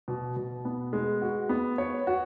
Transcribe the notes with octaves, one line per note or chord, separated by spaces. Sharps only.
B2
B2
B3
G#3
F#4
B3
C#5
F#4